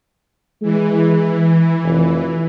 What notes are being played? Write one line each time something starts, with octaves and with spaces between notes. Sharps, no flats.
E3 G#3
F1